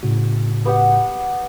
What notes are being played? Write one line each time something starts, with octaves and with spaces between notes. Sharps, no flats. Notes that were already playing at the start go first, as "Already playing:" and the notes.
A2 C#3 F#4
B3 G4 F#5